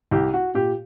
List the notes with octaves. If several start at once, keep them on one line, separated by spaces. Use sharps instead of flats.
C2 G4
F#4
A#2 G4